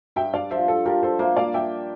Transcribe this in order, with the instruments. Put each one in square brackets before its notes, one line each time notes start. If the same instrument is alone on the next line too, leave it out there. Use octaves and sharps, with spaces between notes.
[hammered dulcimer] G2 [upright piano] E5 G5
[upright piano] D5 F5
[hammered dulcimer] F3 [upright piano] C5 E5
[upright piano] A4
[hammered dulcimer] F3 [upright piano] G4 A#4
[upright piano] A4 C5
[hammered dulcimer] A#3 [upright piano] C5 E5
[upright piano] D5 F5
[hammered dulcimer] D5 [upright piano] E5 G5